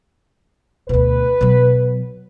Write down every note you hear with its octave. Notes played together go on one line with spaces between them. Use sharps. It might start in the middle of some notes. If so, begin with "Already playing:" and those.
D2 B2 B4
B2 F#3